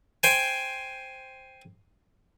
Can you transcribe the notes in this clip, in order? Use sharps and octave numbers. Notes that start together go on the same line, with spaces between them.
C5 G5 G#5